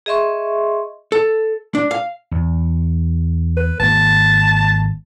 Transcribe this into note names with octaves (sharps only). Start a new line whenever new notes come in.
G#4 D#5 E5 C6 C#6
A4
D4
F5
E2
B4
G#1 A#3 A5